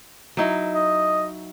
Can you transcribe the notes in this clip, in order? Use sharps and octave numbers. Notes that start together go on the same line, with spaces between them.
F#3 D#4 E4
D#5